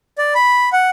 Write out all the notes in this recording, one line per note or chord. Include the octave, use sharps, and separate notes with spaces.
D5
B5
F#5